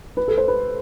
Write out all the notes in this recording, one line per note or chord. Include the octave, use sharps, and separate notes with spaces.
B4
A4
C5
B4